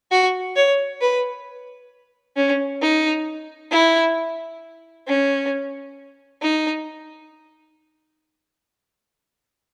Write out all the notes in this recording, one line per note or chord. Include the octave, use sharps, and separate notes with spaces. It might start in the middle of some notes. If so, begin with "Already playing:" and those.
F#4
C#5
B4
C#4
D#4
E4
C#4
D#4